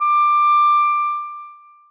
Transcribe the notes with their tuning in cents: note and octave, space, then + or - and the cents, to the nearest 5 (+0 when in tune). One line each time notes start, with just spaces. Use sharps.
D6 +15